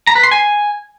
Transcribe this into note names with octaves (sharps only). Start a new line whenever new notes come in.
A#5
B4
C6
G#5